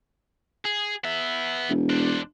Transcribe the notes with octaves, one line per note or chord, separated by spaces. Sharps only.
G#4
B3 E5
E1
D4 C5